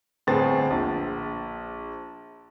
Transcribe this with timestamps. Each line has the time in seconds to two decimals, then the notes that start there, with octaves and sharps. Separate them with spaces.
0.27 G1 A2 B3 C4 G#4 A6
0.70 A#1